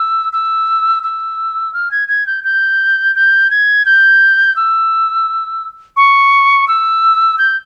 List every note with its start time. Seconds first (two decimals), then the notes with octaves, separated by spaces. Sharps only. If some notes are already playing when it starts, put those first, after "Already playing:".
Already playing: E6
0.33 E6
1.03 E6
1.74 F6
1.91 G#6
2.08 G#6
2.27 G6
2.44 G6
3.15 G6
3.50 G#6
3.86 G6
4.56 E6
5.97 C#6
6.68 E6
7.38 G6